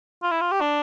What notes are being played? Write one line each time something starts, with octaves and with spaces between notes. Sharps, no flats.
F4
E4
F4
G4
D4